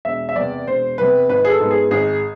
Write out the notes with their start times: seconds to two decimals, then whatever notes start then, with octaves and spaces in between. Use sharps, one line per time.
0.05 E1 E5
0.29 E5
0.35 E2 C3 D5
0.67 E1 C5
0.98 E2 C3 B4
1.29 G#1 B4
1.45 G#4
1.50 A4
1.60 G#2 G#3 B3
1.71 G#4
1.91 G#1 G#4